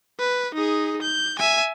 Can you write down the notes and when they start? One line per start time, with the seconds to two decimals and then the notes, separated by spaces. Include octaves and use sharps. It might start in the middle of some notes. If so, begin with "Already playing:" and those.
0.19 B4
0.55 D#4 G#4
1.02 G6
1.39 E5 G#5